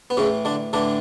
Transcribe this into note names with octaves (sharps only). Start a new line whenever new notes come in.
B3
A2 C#3 E3 C#4
D3 D4
A2 D3 E3 D4